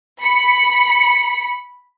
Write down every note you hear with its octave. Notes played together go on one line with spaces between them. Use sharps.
B5 C#7